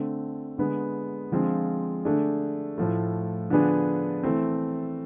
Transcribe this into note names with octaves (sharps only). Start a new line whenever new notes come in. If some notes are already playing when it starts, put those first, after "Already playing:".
Already playing: D3 A3 C4
D3 G#3 B3
D3 F3 G#3 C4 F4
D3 A3 D4 G#4
A2 F3 A3
D3 F3 B3 D4 G#4
E3 A3 C4